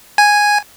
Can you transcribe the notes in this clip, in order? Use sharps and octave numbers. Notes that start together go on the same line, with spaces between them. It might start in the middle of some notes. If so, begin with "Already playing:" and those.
G#5